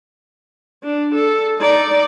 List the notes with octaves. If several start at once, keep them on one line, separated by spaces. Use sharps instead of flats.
D4
A4
D#4 D5